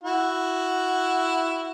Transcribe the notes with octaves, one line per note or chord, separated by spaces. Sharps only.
E4 F#4